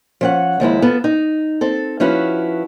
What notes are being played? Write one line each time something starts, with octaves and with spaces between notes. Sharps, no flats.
F3 C#4 F#5
D#2 F3 G#3 E4
B3 F4 A4
D#4
C4 A4
F3 C#4 E4 F#4 B4